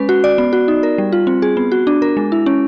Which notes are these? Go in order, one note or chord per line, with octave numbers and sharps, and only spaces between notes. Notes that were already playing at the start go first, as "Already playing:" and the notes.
Already playing: G#3 C#4 B4
F#4
D5
B3
F#4
D#4
A#4
G3
F4
C4
G#4
B3
F#4
D4
A#4
G#3
E4
C#4